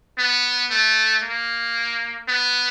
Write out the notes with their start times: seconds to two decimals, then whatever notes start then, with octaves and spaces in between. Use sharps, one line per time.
0.18 B3
0.70 A3
1.23 A#3
2.28 B3